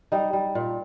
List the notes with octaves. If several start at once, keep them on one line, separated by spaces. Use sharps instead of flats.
G3 D#4
G3
A#2